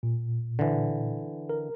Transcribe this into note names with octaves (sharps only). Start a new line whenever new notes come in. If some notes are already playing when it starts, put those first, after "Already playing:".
A#2
D3 E3
A#4